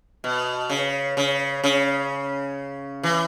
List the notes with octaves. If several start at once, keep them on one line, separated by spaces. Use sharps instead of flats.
B2
C#3
C#3
C#3
E3